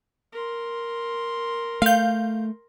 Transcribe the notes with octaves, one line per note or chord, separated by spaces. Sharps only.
A#4 C6
A3 F5 G6